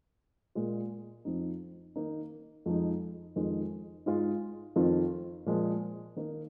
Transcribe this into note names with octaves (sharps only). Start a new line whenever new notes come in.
A#2 G#3 F4
F2 F3 C4 D#4
D#3 A#3 D#4
F2 F3 G#3 D#4
F2 D#3 G#3
G#2 G#3 F4
F2 D#3 C4 F4
A#2 F3 G#3
D#3 A#3 D#4